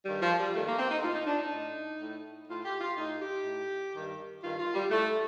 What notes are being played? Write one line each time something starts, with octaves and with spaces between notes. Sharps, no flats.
G2 D#3 G3
F3
G3
G2 D#3 A3
A#3
C4
D#4
A2 F4
D#4
D4
D#4
A2
A2
A2 F4
G4
F4
A2 D#4
G4
A2
G2 D#3
G2 D#3 F4
F4
G3
A2 A3